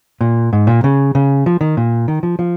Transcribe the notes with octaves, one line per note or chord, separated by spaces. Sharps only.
A#2
G#2
A#2
C#3
C#3
F3
D#3
A#2
D#3
F3
F3